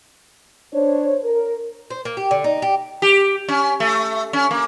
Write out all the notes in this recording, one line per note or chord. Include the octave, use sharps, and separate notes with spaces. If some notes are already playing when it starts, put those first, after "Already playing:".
D4 C5 C#5
A#4
C5
A#3
G4
D3
D#4
G4
G4
C#4
A3
C#4
A#3